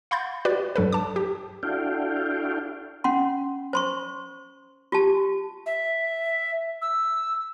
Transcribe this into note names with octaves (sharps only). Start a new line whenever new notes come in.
F5 F#5 B5 C6 G6 A6
F#4 G4 B4 D5
G2 F#3 A4 B4
A5 D6
G4
D4 E4 F#4 A4 F5 G5
C#4 F#5 C6
C5 C6 C#6
F4 G4 A5
E5
E6